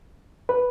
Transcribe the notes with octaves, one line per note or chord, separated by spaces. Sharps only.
B4